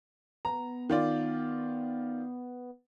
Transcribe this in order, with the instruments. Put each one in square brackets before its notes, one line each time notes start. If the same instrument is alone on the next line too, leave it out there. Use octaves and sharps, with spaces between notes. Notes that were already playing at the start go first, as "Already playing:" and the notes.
[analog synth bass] B3 [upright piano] A#5
[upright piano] D#3 F4 D5